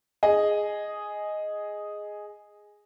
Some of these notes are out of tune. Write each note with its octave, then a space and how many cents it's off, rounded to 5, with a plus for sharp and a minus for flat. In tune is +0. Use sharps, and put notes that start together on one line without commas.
G#4 +0 D#5 +0